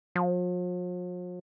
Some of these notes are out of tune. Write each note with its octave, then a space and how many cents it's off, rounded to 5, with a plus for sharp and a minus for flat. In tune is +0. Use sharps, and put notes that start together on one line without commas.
F3 +45